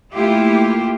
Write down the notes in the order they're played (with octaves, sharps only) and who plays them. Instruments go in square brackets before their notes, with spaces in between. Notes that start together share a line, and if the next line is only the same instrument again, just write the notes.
[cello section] A3 A#3 E4 F4 G4